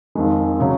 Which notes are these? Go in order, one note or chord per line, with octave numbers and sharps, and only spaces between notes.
F2 D#3 G#3
C#3 F#3 C#4